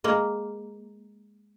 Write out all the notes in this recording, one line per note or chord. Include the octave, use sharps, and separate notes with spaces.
G#3 A#3